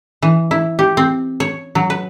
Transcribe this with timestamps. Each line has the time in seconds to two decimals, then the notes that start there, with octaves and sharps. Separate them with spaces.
0.22 E3
0.51 E4
0.79 G4
0.97 C4
1.40 C#5
1.75 F#3
1.90 B4